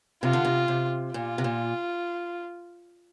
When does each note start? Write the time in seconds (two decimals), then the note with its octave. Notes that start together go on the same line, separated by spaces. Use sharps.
0.23 C3 F4
0.33 D3
0.45 C3
0.68 C3
1.14 A#2 F4
1.38 C3
1.44 A#2